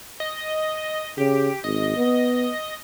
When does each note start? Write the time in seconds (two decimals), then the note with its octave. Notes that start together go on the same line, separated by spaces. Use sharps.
0.20 D#5
1.18 C#3 G4
1.64 G#1 D#5
1.97 B3